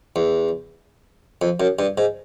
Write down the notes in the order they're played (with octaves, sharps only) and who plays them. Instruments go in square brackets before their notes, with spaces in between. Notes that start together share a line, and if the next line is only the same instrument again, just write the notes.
[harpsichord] E2
F2
F#2
G2
G#2